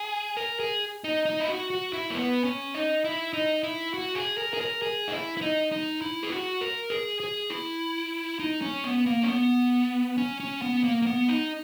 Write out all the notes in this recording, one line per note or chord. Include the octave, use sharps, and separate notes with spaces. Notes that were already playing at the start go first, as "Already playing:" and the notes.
Already playing: G#4
A#4
G#4
D#4
D#4
E4
F#4
F#4
E4
A#3
B3
C#4
D#4
E4
D#4
E4
F#4
G#4
A#4
G#4
A#4
G#4
D#4
E4
E4
D#4
D#4
E4
G#4
F#4
A#4
G#4
G#4
E4
D#4
C#4
B3
A#3
C#4
B3
C#4
C#4
B3
A#3
A#3
B3
D#4